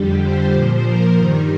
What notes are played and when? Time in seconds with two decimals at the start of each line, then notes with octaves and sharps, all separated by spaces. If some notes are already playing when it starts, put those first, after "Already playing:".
Already playing: F2 D3 G3 G4
0.21 C5
0.52 A#2 F3
0.84 A#4
1.15 G2 D#3 G3